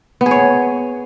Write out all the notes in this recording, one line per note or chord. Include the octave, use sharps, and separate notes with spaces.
B3
G#4
C#5